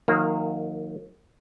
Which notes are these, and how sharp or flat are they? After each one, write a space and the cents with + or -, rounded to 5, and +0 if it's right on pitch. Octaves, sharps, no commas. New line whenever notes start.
D#3 +0 F#3 -45 A#3 -20